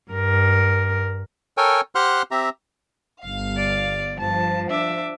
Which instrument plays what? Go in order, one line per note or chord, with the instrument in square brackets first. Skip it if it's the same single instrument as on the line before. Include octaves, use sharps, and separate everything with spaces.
[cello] G2 A#4
[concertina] A4 A#4 C#5 G5 G#5
G4 C5 F#5 C6 F6 F#6
C4 G4 E5 A#5
[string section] G1 F5
[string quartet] D5
[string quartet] G2 A5 [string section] F3
[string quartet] D4 E5 D6